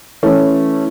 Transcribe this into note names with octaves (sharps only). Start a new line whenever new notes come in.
E3 A3 C#4